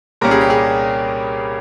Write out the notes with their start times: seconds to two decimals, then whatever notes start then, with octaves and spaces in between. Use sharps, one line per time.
0.21 C2 A#2 G3 A#3 C#4 A#4
0.31 G#4
0.41 G4
0.50 G#4